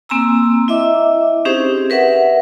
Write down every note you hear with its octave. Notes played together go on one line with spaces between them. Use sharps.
A#3 C4 G#5 A#5 E6
E4 D#5 E5 D6
C4 C#4 D#4 G4 G#4 C5
A#4 B4 E5 F#5